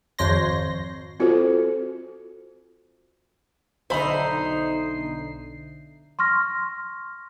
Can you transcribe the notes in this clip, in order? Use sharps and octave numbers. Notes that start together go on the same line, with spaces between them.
G#1 F2 C5 C#5 C6 A#6
C4 F4 F#4 A4 C5
B1 D3 D#4 C5 E5 B5 C7
C6 C#6 F6 A#6